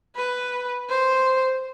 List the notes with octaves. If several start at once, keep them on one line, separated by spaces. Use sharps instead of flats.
B4
C5